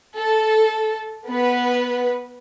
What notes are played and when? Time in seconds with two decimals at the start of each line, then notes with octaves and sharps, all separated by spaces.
0.18 A4
1.27 B3 B4